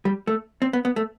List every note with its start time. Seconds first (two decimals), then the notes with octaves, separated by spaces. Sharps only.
0.05 G3
0.27 A3
0.62 C4
0.73 B3
0.85 B3
0.96 A3